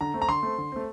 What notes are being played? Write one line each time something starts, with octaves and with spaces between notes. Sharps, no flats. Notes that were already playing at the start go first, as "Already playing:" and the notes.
D3 A#5
A3 C4
A#5
D3 C6
A3 C4
D3
A3 C4